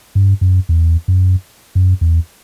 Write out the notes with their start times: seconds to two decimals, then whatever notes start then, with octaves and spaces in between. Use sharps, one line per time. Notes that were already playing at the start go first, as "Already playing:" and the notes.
0.15 G2
0.41 F#2
0.69 E2
1.08 F#2
1.75 F#2
2.01 E2